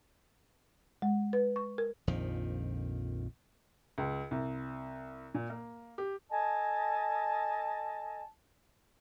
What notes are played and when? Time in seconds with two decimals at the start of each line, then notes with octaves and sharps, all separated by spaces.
1.02 G#3
1.33 B4
1.56 C#6
1.78 A#4
2.07 A#1 F2 D#3 F3
3.98 C#2
4.31 C2
5.34 A#2
5.50 A#3
5.98 G4
6.29 A4 D#5 G#5 A5